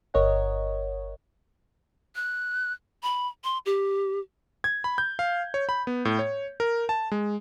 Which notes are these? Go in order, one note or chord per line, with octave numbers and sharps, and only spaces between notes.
G1 A#4 C#5 D#5 F#5
F#6
B5
C6
G4
G#6
B5
G6
F5
C#5
B5
B3
A2
C#5
A#4
A5
G#3